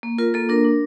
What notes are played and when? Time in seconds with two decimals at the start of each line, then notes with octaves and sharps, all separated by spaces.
0.03 A#3
0.18 F4 A#4
0.34 A#3 A4
0.49 D4 A#4
0.65 D4